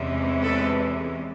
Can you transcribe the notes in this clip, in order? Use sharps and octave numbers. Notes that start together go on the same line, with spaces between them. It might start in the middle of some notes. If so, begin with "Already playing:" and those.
Already playing: E2 C3 E3 G#3 C#4
A4 B4